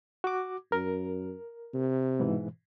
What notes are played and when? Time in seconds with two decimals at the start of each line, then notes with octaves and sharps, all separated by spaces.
0.24 F#4 D6
0.72 F#2 A#4
1.74 C3
2.20 G#2 B2 E3